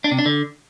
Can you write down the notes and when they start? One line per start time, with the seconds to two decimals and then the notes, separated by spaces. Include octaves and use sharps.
0.04 D4
0.11 C3
0.19 D4
0.26 D3